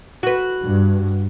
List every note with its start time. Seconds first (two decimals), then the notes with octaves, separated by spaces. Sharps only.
0.23 F#4 B4
0.62 G2